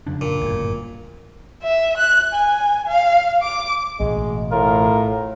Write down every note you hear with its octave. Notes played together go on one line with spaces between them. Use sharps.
F2 C#3 D4
A#2
G1 F#2 A2
E5
F#6
G#5
F5
D6
A1 B2 G#3
A2 F4 A#4